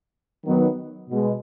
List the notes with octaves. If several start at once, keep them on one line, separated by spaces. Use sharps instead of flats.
D#3 F#3 B3
B2 G#3